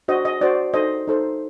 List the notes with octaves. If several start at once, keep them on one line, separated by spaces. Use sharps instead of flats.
D4 F#4 C5 D#5
D#5
D4 F#4 C5 D5
D#4 A4 C5 D#5
D#4 A4 C5